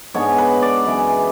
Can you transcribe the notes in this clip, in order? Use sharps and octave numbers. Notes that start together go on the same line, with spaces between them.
G#2 G#3 B3 D4 C#5
B4
D5
F#2 E3 G#3